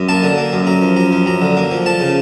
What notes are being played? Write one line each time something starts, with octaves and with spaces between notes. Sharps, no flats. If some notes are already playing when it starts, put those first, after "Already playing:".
Already playing: F#2
A#3 A5
D3
A#3
F#2
F#2 A#5
F3
F#2 A#5
F3
F#2 A#5
D3
A#3
F3
F3 A5
C#3